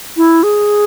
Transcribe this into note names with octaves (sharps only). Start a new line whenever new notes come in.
E4
G#4